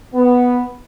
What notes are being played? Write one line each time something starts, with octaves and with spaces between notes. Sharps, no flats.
B3